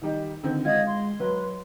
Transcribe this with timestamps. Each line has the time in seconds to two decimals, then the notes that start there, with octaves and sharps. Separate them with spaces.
0.02 D#3 G3 D#4
0.44 D3 D#3 C4
0.65 G#3 F4 D#5 F#5 G#6
0.87 C6
1.20 F#3 B4